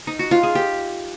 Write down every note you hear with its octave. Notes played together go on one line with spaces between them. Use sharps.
D#4
F#4
F4
G#4
G4